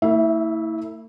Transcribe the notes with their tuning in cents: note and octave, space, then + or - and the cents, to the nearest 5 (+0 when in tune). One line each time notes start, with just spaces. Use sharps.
A3 +45 E4 -25 E5 +0